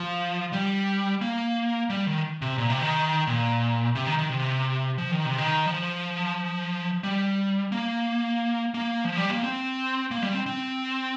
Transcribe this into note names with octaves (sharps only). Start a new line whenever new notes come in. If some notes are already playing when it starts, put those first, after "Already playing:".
Already playing: F3
G3
A#3
G3
D#3
C3
A#2
C3
D#3
A#2
C3
D#3
D#3
C3
F3
D#3
C3
D#3
F3
G3
A#3
A#3
F3
G3
A#3
C4
A#3
G3
C4
C4